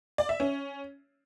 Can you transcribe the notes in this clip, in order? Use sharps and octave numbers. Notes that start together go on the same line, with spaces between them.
D5
E5
C#4